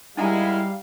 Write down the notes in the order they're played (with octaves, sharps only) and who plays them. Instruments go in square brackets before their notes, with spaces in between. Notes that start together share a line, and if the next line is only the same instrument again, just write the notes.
[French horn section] D#3 E4 [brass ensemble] G3 F5 [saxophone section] G#3 [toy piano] D#4 F#5 A#5